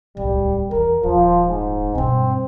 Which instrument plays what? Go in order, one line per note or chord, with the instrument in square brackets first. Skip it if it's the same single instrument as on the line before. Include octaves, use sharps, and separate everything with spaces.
[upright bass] D1 C2 [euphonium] G3
[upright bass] E2 E3 [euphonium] A#4
[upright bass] D#1 [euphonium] F3
[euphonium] G#2
[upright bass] G2 B2 [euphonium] C4